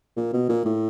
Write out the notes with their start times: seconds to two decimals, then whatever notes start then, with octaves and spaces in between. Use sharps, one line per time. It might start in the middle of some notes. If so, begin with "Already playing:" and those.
0.17 A#2
0.33 B2
0.49 A#2
0.65 A2